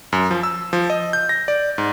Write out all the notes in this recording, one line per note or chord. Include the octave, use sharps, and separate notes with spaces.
F#2
F3
E6
F3
D#5
G6
A#6
D5
G#2